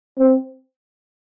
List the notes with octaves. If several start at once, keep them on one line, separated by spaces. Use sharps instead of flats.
C4